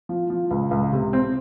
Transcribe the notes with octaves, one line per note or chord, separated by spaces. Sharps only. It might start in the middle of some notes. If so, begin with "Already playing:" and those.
F3
F3
C#2
C#2
C3
C4